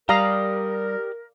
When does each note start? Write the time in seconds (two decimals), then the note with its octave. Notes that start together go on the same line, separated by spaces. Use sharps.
0.09 G3 G4 A#4 D5 F5 A#5 D#6